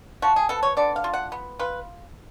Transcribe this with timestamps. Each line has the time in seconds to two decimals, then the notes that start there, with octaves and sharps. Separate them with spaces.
0.22 F3 F#4
0.36 G#4
0.49 B3 A4
0.63 C#5
0.77 D3 D5
0.96 F5
1.04 F4
1.13 F#5
1.32 B3
1.59 F4 B4